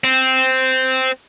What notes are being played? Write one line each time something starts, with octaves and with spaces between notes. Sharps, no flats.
C4